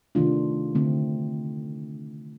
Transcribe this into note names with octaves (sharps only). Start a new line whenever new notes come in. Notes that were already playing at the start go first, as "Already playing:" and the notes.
C3 D#3 A3 D4 F4
D3 A3 C4